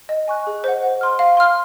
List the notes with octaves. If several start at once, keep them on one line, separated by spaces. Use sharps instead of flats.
D#5
G#5 C#6 F#6
G#4
C5 D#5 F#5
F#5
C6 F6
F5
C6 F6